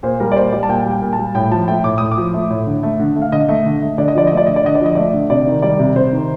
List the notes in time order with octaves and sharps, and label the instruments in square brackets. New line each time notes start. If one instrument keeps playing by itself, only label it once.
[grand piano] A#2 C5
G3 A#4
D5
A#2 C5
G3 D5
A5
A#2 G5
G3
G5
A#2
A5
G3
A2 G5
F3 A5
A3 G5
A2 D6
A2 D#6
D6
F3
A3
A2
D3
A3
D3
A3
F5
D3 D#5
A3
D3
A3
D3 D5
D#5
F3 D5
A3 D#5
D5
D3 D#5
D5
D3 D#5
D5
F3
D#5
A3 D5
D3
C3 D5
D#3
G3 D5
C3
C3 C5
D#3